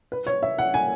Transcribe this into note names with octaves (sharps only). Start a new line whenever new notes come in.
B4
C#5
E5
F#5
G#5